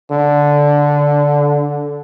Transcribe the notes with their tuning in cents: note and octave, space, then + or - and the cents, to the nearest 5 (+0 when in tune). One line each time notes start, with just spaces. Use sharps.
D3 -10